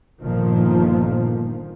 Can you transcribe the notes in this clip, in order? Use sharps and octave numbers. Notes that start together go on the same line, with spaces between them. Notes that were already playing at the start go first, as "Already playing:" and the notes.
G1 A#2 D#3 F3